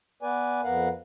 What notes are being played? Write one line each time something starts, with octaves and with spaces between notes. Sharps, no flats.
B3 B4 D5 G#5
F2 B3 A#4 F5 F#5